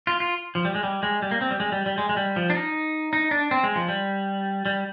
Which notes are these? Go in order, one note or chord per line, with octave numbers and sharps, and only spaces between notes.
F4
F4
F3
G3
G#3
G3
G#3
G3
A#3
C4
G3
G#3
G3
G3
G#3
G#3
G3
F3
D4
D#4
D#4
D4
C4
G#3
F3
G3
G3